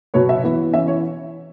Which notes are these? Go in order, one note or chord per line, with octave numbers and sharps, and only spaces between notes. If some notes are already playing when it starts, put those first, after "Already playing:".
B2 F#3 B3 C#5
E5
E3 B3
E3 C#4 E5
C#5